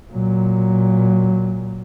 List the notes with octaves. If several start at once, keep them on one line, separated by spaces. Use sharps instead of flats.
A#2 F#3